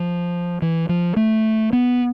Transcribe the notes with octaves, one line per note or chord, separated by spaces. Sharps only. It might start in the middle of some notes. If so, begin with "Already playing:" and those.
Already playing: F3
E3
F3
A3
B3